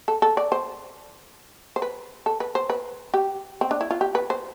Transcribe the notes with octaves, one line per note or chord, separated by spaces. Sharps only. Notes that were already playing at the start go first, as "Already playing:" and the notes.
A4
A4
D5
C5
C5
B4
A4
B4
C5
B4
G4
C4
D4
E4
F4
G4
B4
C5